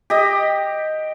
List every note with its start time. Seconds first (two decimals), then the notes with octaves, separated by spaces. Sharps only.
0.10 G4 D#5